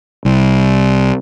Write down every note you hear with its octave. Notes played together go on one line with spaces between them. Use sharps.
C2